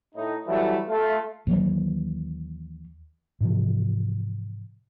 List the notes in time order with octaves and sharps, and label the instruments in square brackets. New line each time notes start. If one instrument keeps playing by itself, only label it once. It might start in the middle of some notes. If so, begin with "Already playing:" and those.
[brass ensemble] A2 D#4
E3 F#3 G3 A3
A3 F4
[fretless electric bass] D#2 D#3 E3 F#3
[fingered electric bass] G#2 C3 E3 F3